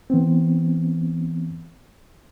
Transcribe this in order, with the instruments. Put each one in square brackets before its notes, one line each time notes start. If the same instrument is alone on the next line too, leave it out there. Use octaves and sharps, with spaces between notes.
[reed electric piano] E3 B3 C4